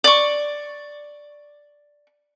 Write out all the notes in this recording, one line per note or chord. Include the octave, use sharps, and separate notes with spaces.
D5 C#6